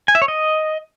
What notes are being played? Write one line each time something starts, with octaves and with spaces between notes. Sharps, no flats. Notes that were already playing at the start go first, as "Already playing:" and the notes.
G#5
E5
C#5
D#5